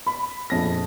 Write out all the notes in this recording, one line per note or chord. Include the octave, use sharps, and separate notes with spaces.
B5
A#1 F2 A#6